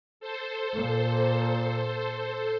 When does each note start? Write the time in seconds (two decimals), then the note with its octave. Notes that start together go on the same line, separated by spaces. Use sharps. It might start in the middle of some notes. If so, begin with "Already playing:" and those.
0.20 A4 C5
0.73 A#2